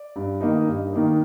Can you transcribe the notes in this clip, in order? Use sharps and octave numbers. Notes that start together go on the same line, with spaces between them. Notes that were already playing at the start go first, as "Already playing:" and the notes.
Already playing: D5
G2
D#3 A#3 D#4
G2
D#3 A#3 D#4